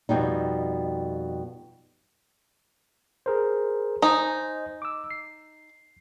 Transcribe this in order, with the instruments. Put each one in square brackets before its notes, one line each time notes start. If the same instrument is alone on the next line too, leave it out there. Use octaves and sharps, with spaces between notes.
[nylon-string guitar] F2 B2 G3 D#4
[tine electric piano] G#4 A#4 C5
[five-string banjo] D#4 [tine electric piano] C5 D#5 G#5
[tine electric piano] D6 E6
C7